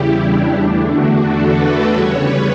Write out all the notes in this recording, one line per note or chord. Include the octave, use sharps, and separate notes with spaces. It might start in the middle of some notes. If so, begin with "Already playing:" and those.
Already playing: E2 C#3 G3 E4 G4
D4
E2 D3 A3
F#4
A4
B4
E2 C#3 G3 C#5
B4